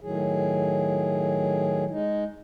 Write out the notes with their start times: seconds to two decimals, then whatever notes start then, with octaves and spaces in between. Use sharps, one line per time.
0.01 A2 D#3 F#3 G#4
1.91 G#3 D#4